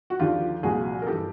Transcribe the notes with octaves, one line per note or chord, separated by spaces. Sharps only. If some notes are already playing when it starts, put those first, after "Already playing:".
F#4
D#2 D3 F3 F4 G4
C2 A#2 F3 F#4 G#4
A#4
G2 E3 G4 A4